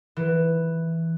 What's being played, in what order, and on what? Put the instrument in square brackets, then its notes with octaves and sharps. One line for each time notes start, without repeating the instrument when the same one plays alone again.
[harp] E3